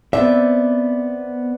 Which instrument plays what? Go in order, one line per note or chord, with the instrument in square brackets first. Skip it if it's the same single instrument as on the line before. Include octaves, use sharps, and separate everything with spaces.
[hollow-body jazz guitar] B3 C4 E5 [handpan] D5